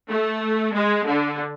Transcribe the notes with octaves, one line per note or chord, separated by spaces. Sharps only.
A3
G#3
D3